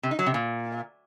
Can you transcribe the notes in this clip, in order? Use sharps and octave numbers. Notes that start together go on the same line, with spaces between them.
C3
D#4
F#3
C3
A#2